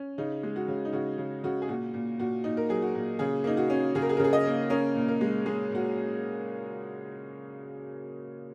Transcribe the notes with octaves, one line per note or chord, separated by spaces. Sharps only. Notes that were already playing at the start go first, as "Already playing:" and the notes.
Already playing: C#4
C#3 D#4
G#3
F#4
C#3
D#4
C#3 F#4
C#3
C#3 F#4
G#4
A#2 F#4
A#2
A#2 F#4
A#2 D#4
A#4
F#3 G#4
F#4
A#2
C#3 G#4
A#3 D#4
F#4
C#4
C#3 G#4
A#4
G#4
A#4
C#3 G#4
D#5
A#3
C#4 A#4
A#2
A#4
G#3
G#3 G#4
A#2 F#4